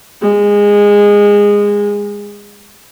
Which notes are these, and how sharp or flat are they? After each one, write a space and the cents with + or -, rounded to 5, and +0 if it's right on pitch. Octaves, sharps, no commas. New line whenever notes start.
G#3 -20